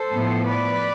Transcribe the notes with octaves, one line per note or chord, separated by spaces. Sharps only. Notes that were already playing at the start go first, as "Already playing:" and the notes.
Already playing: A4 C5
A2 F3 B3
B4 D5